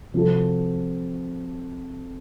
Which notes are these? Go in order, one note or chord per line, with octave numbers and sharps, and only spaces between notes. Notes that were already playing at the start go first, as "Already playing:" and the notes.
C3 F3 C4 F#4 A4